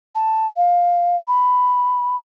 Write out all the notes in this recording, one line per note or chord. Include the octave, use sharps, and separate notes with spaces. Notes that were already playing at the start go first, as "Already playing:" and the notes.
A5
F5
B5